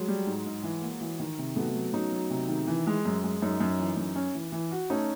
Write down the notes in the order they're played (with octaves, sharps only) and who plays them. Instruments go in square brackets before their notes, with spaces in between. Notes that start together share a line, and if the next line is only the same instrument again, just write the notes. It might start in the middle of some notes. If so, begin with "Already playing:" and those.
Already playing: [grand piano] F#3 G#3
[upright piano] G3
G#2
G#2
E3
A#3
E3
D#3
C3
[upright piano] F#3 [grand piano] A3 B3
[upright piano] F#3
[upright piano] F#3 [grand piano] C#4 D#4
[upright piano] F#3
C3
D#3
E3
G#3
F#2
G#3
[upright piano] F#2 [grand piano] C#4 D#4
[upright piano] F#2
E3
F#2
C#4
E3
E3
F#4
[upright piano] A3 [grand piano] C#4 D#4